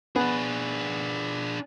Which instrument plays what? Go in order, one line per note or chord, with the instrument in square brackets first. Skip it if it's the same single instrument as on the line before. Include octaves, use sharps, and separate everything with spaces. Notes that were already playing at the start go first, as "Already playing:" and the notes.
[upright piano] B3 [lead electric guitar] D4 G#4